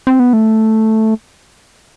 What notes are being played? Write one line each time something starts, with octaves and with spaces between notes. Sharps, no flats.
C4
B3
A3